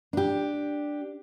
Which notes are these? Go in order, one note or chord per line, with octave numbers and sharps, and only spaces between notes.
D4 G4